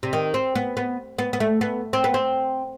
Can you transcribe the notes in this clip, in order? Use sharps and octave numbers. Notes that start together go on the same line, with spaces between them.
C3
D#3
C4
B3
B3
B3
B3
A3
B3
C4
B3
C4